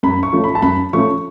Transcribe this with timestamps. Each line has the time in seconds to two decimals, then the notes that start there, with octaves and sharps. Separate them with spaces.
0.03 F#2 B5
0.23 C#6
0.33 F3 A3 C#4
0.44 B5
0.55 A5
0.62 F#2 B5
0.93 F3 A3 C#4 C#6